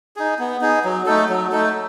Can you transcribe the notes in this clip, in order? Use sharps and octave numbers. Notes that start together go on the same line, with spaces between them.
D#4 G#4
B3
D#4 G#4
F#3
A3 D#4 A4
F#3
A3 D#4 A4